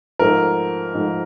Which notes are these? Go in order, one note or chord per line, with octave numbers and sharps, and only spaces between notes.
G#2 F3 A3 A#4
G#2 F3 A3